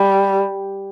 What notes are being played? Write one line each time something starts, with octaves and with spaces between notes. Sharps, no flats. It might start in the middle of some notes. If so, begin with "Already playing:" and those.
Already playing: G3